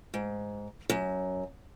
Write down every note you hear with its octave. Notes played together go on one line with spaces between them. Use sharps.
G#2
F#2